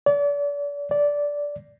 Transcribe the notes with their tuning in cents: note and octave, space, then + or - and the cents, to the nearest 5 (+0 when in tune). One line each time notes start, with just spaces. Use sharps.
D5 -35
D5 -10